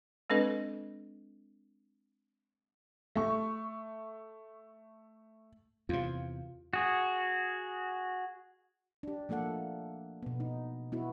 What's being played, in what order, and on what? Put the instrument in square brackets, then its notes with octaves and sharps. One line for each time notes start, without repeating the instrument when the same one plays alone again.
[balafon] G#3 C4 D4 A4 B4 D#5
[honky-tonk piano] A3 C#6
[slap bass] E2 C3 [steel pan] F4
[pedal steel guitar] F#4 G#4
[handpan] D4 G4
F3 A3 A#3 A4 F#5
B2 B3
D#4
B3 E4 F#4